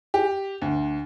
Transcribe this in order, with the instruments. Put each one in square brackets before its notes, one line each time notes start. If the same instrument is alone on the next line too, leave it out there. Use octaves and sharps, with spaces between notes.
[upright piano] G4
D2